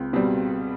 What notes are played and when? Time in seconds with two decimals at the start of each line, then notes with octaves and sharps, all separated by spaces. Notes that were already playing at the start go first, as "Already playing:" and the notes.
Already playing: C#2 C4
0.13 B2 G3 C4